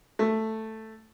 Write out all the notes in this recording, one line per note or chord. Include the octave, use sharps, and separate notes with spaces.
A3